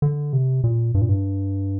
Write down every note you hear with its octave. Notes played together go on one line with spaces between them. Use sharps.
D3
C3
A#2
G2
A#2
G2